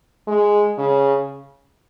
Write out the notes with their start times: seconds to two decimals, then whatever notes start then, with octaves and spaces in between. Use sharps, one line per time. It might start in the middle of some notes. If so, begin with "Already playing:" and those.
0.28 G#3
0.78 C#3